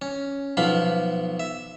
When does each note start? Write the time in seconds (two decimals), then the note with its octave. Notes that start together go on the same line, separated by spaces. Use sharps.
0.02 C#4
0.57 B1 F3 B3 F5 B5
1.40 E5